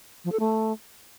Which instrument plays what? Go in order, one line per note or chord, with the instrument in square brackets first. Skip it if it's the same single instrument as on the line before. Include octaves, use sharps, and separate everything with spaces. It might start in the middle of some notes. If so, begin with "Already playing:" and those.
[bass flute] F3
A4
A3